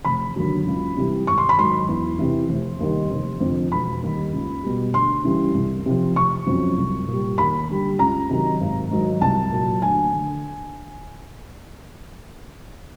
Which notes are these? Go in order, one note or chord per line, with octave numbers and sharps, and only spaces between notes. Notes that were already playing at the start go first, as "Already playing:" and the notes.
F1 B5
D#2 D3 F#3
C#2
C3 E3 G3
G#1 C#6
C6
B5
G#2 D#3 F#3 C6
E2
C3 E3
F1
D#2 D#3 G3
F1
F2 D3
E1 B5
D#2 D#3 G3
C#2
B2 G3
D2 C6
C#3 E3 G3
C2
C3 F3
F1 C#6
F2 C#3 F#3
C2
A#2 G3
D#2 B5
D3 G3
C#2 A#5
C3 D#3 F#3
G#1
G#2 D#3 F#3
C2 A5
A#2 F#3
D2 G#5
D3